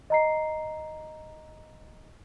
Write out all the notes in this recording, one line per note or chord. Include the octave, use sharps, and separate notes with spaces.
D#5 A#5 C7